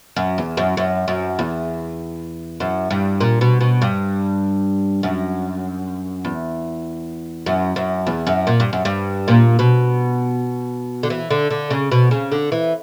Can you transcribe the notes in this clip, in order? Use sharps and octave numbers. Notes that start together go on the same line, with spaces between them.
F#2
E2
F#2
F#2
F#2
E2
F#2
G2
A#2
B2
B2
G2
F#2
E2
F#2
F#2
E2
F#2
A#2
G2
F#2
G2
A#2
B2
D3
E3
D3
D3
C#3
B2
C#3
D3
E3